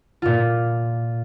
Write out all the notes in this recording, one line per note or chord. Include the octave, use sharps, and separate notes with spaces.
A#2 F4